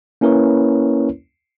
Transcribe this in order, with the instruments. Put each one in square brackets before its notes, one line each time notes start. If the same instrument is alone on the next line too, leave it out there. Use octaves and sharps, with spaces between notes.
[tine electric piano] A#3 C#4 E4 A#4 B4 C#5